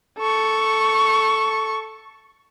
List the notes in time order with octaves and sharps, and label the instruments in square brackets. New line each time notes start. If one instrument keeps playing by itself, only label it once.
[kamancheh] A4 C#6